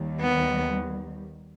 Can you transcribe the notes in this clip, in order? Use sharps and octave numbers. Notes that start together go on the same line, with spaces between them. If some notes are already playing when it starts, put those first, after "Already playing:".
Already playing: D#2 D#3 G3
B3